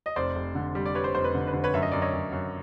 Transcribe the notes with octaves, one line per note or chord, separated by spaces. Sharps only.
D#5
F1 C5 D5
F1
D3
G3
D5
G3 B4 C#5
C5
F1 C5
B4
D3
B4
D3 C5
B4 C#5
F#2 E5
D#5
F#2 D5
C#5 D#5
F#2
F#2